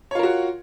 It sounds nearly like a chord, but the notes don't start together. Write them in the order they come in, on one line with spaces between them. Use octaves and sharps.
C#5 F4 A#4 F#4